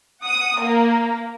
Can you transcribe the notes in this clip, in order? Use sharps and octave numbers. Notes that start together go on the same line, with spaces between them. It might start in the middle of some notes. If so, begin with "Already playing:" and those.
F#5 D#6
A#3 A#4